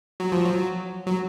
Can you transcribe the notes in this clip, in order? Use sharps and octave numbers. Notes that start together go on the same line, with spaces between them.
F#3
F3
F#3
F#3